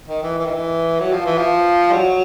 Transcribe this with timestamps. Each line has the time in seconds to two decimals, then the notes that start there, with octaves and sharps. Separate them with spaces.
0.08 D#3
0.23 E3
0.39 E3
0.46 D#3
0.53 E3
1.00 F#3
1.13 F3
1.26 E3
1.38 F3
1.90 G3
1.93 F#3